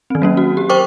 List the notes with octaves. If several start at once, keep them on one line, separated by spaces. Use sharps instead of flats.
D#3 C4
F#3 A#3 C#4
F#4
G4
A#4 C5 G5 C#6 D6